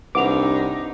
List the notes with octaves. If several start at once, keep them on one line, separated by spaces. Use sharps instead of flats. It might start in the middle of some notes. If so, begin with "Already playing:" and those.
C2 D4 D#4 B4 F#5 D6 F7